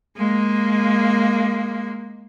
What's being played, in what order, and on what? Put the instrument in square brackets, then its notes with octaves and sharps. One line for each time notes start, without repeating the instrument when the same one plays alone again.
[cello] G#3 A#3